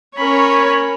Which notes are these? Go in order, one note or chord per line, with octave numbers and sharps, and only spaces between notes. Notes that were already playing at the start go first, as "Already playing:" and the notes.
C#4 A#4 C#5 B5